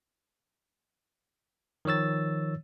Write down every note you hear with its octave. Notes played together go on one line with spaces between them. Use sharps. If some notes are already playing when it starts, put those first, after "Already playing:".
D#3 F3 C#5 E6 A6